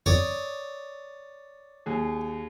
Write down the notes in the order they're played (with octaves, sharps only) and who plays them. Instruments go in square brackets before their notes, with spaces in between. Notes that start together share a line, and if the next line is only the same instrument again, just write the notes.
[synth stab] G1 F2 [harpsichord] C#5 D5 D#6
[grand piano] D#2 G#4